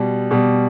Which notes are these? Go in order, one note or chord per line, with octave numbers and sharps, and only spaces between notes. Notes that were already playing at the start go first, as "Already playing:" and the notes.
Already playing: B2 G3
B2 G3